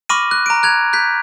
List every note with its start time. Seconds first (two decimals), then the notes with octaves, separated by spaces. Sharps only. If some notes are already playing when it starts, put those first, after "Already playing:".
0.09 B5 C#6 D6 F6 A#6 D#7
0.31 F#6
0.46 A#5 D7
0.63 F#6 G#6 F7
0.93 F#6 G6 B6